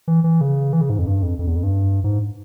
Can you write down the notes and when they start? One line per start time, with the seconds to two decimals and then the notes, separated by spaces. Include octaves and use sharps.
0.08 E3
0.24 E3
0.41 C#3
0.73 E3
0.81 C#3
0.90 G#2
0.99 F2
1.07 G2
1.22 F2
1.39 F2
1.47 E2
1.56 F2
1.63 G2
2.04 G#2